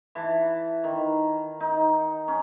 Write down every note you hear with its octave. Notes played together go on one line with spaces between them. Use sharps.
E3 A5
D#3
D#4
C#4